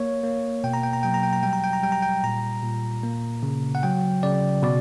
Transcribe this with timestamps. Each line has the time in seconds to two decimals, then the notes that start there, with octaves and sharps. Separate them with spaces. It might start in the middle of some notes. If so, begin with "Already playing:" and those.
Already playing: A#3 C#5
0.23 A#3
0.64 B2 G5
0.74 A#5
0.83 G5
0.93 A#5
1.03 F#3 G5
1.14 A#5
1.23 G5
1.33 A#5
1.43 G3 G5
1.53 A#5
1.64 G5
1.73 A#5
1.83 G3 G5
1.92 A#5
2.02 G5
2.23 A#2 A#5
2.63 A#2
3.03 A#3
3.43 C#3
3.75 F#5
3.83 F#3 G5
4.23 C#3 D5
4.63 B2 D5